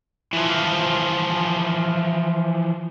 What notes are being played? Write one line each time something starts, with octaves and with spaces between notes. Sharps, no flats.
E3 F3